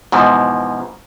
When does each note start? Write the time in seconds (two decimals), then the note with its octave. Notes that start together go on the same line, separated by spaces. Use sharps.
0.12 G#2 B2 E3 F3